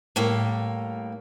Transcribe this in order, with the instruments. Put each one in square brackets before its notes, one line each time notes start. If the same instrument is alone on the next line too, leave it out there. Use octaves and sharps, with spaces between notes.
[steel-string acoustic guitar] A2 G3 A#3